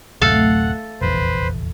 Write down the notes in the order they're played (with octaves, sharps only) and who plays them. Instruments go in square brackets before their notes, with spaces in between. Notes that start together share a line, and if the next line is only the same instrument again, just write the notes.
[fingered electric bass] D1 F#2 C3 [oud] A3 [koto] A4 F5 [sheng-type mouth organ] F#5
[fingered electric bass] F1 A#1 E2 [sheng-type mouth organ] B4 C5